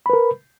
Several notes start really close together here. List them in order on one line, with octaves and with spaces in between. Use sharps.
B5 B4 A#4